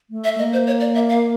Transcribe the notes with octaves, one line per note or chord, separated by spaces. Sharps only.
A3
E5
A#3 D#5
C5
C#5
D5
E5
F5